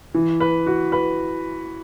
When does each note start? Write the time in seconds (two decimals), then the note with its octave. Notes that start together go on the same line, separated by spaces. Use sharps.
0.15 E3
0.40 B4
0.67 F#4
0.92 B4